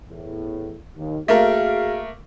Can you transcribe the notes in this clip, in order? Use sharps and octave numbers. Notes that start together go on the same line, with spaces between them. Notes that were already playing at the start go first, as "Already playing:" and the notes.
E2 A2
D#2
A3 A#3 F#4 G#4 A#4 F5